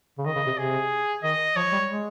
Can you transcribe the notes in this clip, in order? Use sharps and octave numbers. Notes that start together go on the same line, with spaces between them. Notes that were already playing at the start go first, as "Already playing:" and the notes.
C#3
D#3 D#5
C#3
C3
C3 G#4
D#3 D#5
F3 C#5
G3
G#3